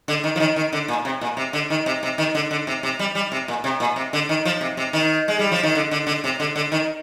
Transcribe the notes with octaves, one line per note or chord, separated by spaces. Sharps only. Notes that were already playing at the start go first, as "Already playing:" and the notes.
D3
D#3
F3
D#3
D#3
D3
A#2
C3
A#2
C3
D3
D#3
C3
C3
D#3
D3
D3
C3
C3
G3
G3
C3
A#2
C3
A#2
C3
D3
D#3
F3
C3
C3
D#3
G#3
G3
F3
D#3
D3
D3
D3
C3
D3
D3
D#3